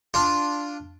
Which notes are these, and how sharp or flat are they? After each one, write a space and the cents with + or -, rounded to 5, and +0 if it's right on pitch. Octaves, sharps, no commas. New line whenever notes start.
D4 +0 F4 +0